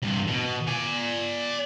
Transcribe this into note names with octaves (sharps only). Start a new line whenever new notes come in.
G2 C3
B2
D5 G#5